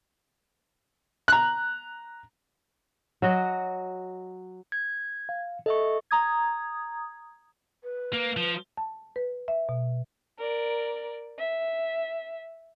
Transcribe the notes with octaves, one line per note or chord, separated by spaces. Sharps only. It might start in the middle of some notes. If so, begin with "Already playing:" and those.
A#5 F#6
F#3 F#4 D#5
G#6
F5
A4 D#5 E5 C#6
A#5 D#6 G#6
B4
A#3
F3
A5
B4
E5
B2
A#4 D5
E5